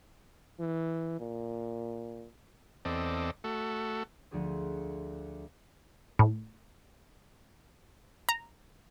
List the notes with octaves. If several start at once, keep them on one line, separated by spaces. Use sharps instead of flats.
E3
A#2
E2 C4 A4 D5 D#5
A3 F#4 A4
D2 F3 D4 G#4 C5
A2
A#5